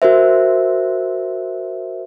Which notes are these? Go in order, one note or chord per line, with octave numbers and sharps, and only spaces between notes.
F#4 A#4 C5 E5